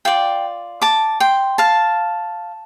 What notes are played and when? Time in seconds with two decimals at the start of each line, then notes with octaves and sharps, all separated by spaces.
0.05 F4 D5 G5
0.82 A5 D6
1.20 G5 C6
1.58 F5 A5